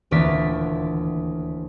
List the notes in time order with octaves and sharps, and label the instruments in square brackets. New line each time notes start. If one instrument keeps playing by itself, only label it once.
[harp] D#1 D2 E3 A#3 D5 B6